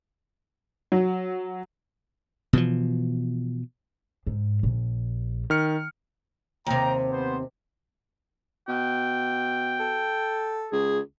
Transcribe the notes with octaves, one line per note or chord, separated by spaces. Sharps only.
F#3
B2 E3 F3
G#2
A#1
D#3 F6 C#7
D#2 C3 G5 A#5
B3 C5
B2 G5
A4
C#2 G#4